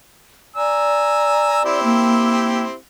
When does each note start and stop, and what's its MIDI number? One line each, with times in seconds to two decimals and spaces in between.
0.56 1.82 74
0.56 1.60 80
0.56 1.60 82
0.56 1.60 88
1.65 2.75 60
1.65 2.75 64
1.65 2.75 67
1.84 2.63 58